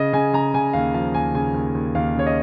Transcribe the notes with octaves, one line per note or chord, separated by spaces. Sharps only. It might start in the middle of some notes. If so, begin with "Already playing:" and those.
Already playing: C#3 D#5
C#3 G#5
C#3 A#5
C#3 G#5
D#2 F5
F3 F5
D#2 G#5
C#3 G#5
D#2
D#2
D#2 F5
C#3 C#5
D#5